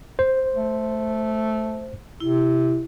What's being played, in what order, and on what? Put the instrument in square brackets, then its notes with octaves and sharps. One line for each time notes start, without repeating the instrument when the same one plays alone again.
[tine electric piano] C5
[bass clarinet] A3
[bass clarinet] C3 [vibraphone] E4